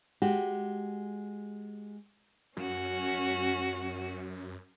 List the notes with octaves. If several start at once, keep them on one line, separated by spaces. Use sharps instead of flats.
G#3 F#4 G4
F#2 C#4 F#4